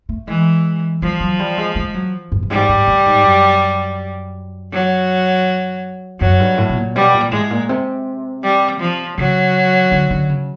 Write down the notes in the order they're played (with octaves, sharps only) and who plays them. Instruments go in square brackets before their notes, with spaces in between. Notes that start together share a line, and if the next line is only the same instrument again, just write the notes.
[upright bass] A3
[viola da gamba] E3 [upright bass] G#3
[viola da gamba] F3 [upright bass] G3
[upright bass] F#3
G3
G#3
G#3
F#3
G2
G2
[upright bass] G#2 [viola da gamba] G3
[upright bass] G#2
A2
G#2
F#2
[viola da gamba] F#3
[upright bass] F#2 [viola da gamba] F#3
[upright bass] G2
A2
B2
A#2
[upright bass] B2 [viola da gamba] G3
[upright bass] A#2
[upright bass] A2 [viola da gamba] G#3
[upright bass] A#2
C3
[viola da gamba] G3
F3
[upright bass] C#3 [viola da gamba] F#3
[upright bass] D3
D3
C#3